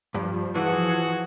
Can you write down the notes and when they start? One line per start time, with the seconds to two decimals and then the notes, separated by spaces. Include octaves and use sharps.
0.14 G2 F3
0.55 E3 F#4 G#4 F#5 A5